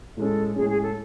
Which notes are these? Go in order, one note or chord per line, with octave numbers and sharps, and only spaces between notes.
A2 G#3 C#4 A4
A2 G#3 C#4 G#4
G#4
A4